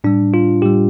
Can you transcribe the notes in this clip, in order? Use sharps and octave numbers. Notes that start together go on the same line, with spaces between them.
A2 G3 D4
F4
A2 G3 G4